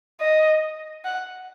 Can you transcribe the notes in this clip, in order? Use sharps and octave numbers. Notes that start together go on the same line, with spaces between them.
D#5
F#5